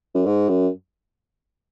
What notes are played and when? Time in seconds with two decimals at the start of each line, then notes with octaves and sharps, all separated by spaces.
0.15 F#2
0.26 G#2
0.49 F#2